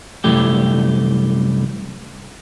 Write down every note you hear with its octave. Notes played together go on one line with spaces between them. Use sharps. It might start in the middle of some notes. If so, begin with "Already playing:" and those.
C2 F#2 E3 A3 G4